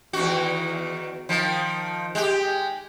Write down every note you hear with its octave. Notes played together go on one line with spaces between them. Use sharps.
E2 D#3 F#4
D#3 F3
G#3 G4